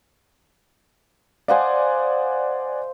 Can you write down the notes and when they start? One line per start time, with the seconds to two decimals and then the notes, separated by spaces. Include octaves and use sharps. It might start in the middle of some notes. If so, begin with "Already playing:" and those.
1.48 C5 D5 D#5 F5 F#5 G#5